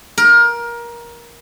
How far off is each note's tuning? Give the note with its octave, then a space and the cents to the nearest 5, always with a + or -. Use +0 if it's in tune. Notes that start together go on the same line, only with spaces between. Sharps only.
A#4 +20